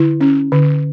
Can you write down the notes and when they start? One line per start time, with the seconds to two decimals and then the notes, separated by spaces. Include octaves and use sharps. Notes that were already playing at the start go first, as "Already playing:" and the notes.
Already playing: D3 E4
0.21 C#4
0.52 D3